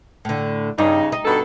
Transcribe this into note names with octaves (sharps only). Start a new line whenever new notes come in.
A2 D3
G2 C#3 D#4
D#4
G2 B2 A4